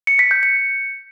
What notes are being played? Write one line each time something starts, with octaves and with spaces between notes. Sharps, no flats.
C#7
B6
G6
C#7